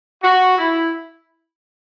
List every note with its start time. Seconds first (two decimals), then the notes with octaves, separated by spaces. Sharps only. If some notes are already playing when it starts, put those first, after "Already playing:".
0.22 F#4
0.57 E4